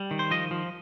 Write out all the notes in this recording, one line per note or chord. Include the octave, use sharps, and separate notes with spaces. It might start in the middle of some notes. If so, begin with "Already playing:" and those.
Already playing: G3
D#3
C5
F3 D#5
F3